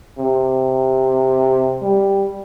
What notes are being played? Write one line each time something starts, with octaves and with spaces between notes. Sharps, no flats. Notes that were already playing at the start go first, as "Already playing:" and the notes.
C3
G3